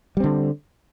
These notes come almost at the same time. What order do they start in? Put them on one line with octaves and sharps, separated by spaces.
G3 C4 D3